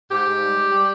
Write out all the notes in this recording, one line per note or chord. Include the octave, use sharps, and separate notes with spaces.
G#2 G4
G#2
G3
G3
G3